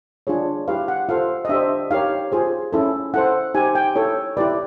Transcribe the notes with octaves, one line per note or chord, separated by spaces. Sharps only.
D4 F4 G#4 C#5
E4 G4 B4 F5
F#5
F4 A4 C5 F5
D#5
D4 G4 C5 E5
D#4 G4 A#4 C#5 F5
F4 G#4 C5
C#4 E4 A4
E4 A4 C5 F#5
D#4 G4 C5 G#5
G5
E4 A4 C#5
E4 G4 B4 D5